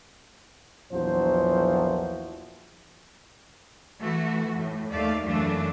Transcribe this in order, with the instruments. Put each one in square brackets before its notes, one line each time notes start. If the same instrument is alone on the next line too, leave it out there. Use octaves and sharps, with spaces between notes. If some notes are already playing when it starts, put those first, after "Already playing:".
[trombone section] A#1 E2 F3 F#3 C5
[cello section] E3 A3 F#4
A2
D#2 A3 D5 F5
F#2 C#3 E3 A3 D4